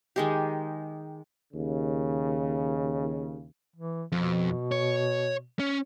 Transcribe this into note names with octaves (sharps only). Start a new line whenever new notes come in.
D#3 G#3 G4
D#2 C#3
E3
F2 B2
C#5
C#4